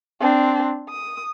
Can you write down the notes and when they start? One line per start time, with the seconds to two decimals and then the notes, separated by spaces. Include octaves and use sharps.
0.20 C4 D4
0.90 D#6